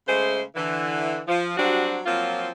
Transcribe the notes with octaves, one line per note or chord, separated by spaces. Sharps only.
C#3 G#3 A3 C5
D3 E3
F3
F#3 G3 C4 D4 F#4
F3 F#3 A#3 C4 F4